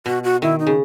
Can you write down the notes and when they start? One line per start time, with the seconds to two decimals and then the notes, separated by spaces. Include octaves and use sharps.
0.06 B2 F#4
0.24 F#4
0.42 D#3 E4
0.60 D#4
0.67 C#3